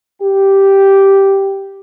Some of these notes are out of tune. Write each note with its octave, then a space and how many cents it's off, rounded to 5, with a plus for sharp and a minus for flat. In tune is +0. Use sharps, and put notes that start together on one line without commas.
G4 -5